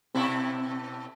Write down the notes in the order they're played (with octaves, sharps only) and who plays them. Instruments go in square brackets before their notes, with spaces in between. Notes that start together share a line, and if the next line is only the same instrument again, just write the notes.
[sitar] B2 E4 A4 [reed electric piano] C4